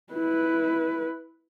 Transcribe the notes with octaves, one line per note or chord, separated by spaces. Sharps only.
E4 B4